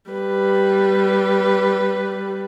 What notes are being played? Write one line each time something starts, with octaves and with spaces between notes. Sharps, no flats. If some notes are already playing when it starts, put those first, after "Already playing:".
G3 B4